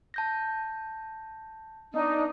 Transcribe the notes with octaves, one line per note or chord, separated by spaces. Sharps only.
A5 G6 A#6
B3 D4 D#4